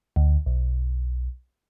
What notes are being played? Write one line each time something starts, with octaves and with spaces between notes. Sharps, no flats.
D2
B1